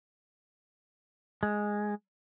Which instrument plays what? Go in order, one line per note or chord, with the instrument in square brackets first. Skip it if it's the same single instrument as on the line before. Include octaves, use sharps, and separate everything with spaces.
[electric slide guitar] G#3